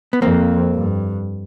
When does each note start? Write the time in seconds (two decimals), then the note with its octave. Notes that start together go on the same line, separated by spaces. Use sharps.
0.13 B3
0.22 F2 A#3 C4
0.75 G2